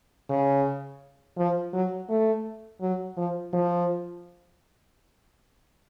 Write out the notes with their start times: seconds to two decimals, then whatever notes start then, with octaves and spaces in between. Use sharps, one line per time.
0.30 C#3
1.38 F3
1.73 F#3
2.10 A3
2.81 F#3
3.17 F3
3.53 F3